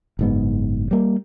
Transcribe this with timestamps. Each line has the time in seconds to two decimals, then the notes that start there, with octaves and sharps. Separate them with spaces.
0.19 F#1 G#2 B3
0.91 G3 A#3